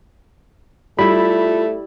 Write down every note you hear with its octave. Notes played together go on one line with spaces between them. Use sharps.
G3 A3 E4 F4 B5